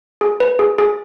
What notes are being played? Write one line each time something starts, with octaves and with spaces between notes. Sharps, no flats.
G#4
B4
G#4
G#4